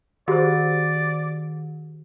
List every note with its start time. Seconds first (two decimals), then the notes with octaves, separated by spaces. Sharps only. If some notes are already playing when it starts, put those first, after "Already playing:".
0.28 D#3 F#4 G4 C5 D5